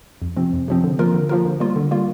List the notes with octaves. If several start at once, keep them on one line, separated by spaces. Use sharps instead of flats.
F2
C3 F3 C4
F2
C3 F3 C4
D3
F3 A#3 F4 A#4
D3
F3 A#3 F4 A#4
D3
G3 A#3 F4
D3
G3 A#3 F4